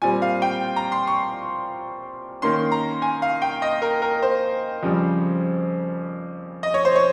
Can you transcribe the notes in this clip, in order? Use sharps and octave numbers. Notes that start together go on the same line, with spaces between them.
A#2 G3 C4 G#5
F5
G5
A#5
C6
C#6
D#3 A#3 C#4 C6
A#5
G#5
F5
G5
D#5
A#4
A#4
C5
F2 C#3 G3
D#5
C#5
C5
C#5